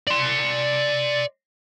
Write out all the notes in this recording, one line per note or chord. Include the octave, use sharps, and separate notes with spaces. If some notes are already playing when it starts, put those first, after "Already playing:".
D5 C6